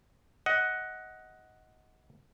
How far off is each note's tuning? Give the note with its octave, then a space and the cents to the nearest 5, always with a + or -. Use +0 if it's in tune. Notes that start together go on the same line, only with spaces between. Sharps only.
D#5 +20 F#5 +0